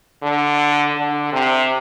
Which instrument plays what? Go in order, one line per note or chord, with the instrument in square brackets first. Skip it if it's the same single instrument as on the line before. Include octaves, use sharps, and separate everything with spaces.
[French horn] D3
D3
C3